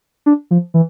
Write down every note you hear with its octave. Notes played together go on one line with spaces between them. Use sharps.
D4
F3
E3